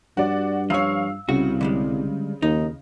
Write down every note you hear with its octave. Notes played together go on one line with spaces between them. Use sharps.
G2 F#4 D5
F3 C#5 F5 E6
C2 C#3 F#4
D3 G3 G#3
D#2 D#4